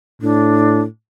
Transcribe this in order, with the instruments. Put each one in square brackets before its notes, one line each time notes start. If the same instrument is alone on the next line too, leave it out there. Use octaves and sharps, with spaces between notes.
[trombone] A2 [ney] D4